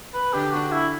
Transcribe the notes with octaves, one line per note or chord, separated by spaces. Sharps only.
B4
D3 D4 G4
F#4
E4